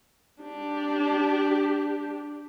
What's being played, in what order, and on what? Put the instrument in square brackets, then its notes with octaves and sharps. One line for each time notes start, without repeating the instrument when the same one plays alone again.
[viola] D4 G4